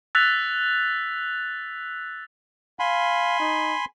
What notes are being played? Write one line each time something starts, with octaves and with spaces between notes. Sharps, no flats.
E6 F#6 A6 B6 F7
F5 G#5 B5 C6
D#4